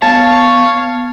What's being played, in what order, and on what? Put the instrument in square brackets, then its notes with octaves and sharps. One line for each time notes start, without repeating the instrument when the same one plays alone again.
[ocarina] B3 [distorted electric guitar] C#5 [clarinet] F5 [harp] A5